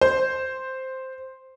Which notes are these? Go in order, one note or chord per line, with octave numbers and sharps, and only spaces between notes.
C5